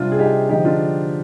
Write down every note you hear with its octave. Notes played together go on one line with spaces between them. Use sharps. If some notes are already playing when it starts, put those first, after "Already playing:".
Already playing: C3 G3 D4 F4
G#4
D#4 G4
D3 F3 G#3 D#4 G4
D4 F4